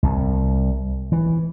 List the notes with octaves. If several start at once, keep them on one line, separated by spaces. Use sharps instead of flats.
C2
E3